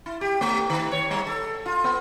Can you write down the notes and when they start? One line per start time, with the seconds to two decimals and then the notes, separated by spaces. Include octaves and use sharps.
0.06 E4
0.21 G4
0.41 A3
0.70 D#3
0.92 C#5
1.11 G3
1.27 A4
1.66 F4
1.84 B3